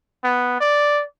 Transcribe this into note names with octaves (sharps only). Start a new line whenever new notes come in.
B3
D5